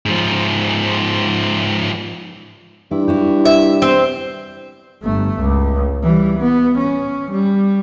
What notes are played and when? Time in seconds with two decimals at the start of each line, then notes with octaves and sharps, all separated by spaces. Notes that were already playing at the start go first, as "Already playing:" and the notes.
0.06 G#2 F3
2.91 G2 E4
3.08 E4 F#4 G4
3.45 E5
3.82 C4 C5
5.03 G1 A3
5.40 C#2
6.03 E3 G3
6.39 B3
6.78 C#4
7.32 G3